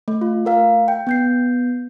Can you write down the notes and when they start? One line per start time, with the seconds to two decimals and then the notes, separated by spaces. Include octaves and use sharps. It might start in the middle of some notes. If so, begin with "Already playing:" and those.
0.08 A3
0.21 F4
0.45 A3 A#4 F5
0.88 G5
1.07 B3 G6 C7